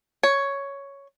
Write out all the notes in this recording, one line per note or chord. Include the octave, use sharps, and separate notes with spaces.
C#5